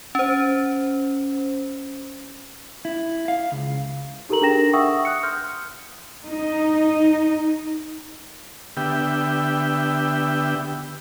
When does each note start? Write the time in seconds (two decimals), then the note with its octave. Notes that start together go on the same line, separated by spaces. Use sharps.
0.15 C#4 C5
2.85 E4
3.28 F5
3.52 C#2
4.29 D#4 G4 A4 A#4 A#5 F#7
4.41 D4 G#4 A#4 G5 A#6 E7
4.73 E5 F#5 G5 C#6 D#6 E6
5.05 D#6 F#6 C#7
5.23 C6 F6 G6
6.29 D#4
8.77 D3 B3 G4 E5 G5